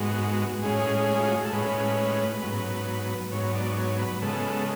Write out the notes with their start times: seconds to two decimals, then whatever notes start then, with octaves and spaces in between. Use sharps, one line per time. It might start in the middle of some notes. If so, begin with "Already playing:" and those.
Already playing: G#2 G#3 B3 F#4
0.63 A2 G#3 C#4 G#4
1.20 F4
1.28 F#4
1.36 G#4
1.45 A4
1.53 A2 G#3 C#4 B4
2.42 G#2 F#3 B3
3.32 G#2 F#3 B3 C#5
3.55 D5
3.77 C#5
3.99 B4
4.22 C#3 G#3 B3 A4